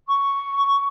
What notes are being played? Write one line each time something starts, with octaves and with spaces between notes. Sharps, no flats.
C#6